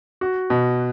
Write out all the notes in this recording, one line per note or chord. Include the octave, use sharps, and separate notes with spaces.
F#4
B2